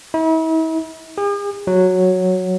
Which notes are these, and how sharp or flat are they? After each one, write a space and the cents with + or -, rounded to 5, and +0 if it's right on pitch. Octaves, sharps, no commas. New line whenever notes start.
E4 -45
G#4 -45
F#3 -5